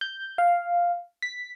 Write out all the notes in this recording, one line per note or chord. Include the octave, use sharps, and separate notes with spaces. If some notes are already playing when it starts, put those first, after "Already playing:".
G6
F5
B6